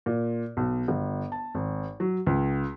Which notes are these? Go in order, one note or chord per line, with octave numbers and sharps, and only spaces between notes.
A#2
B1
G1
A5
G#1
F#3
C#2